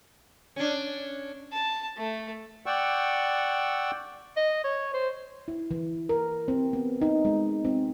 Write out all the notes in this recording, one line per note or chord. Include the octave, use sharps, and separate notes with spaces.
C#4 D4
A5
A3
D5 F#5 G5 C#6 E6
D#5
C#5
C5
E4
E3
A#4
C4
B3
D#4
G#3
C4